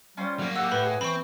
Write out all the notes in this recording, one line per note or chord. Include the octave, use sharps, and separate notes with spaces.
G3 C#4 F4 C5
F#3 A#3
G4 F#5 E6
A2 B4 B5
G#4
E3 C4 B5 C#6